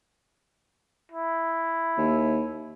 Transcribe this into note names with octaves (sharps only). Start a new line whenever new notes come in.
E4
D#2